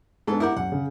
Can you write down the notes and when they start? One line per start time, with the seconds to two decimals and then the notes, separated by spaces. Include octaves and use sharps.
0.27 G#2 G#3 B3 D4 A4
0.40 E4 A#4 F#5 D6 G6
0.57 F#2 F#5
0.72 C#3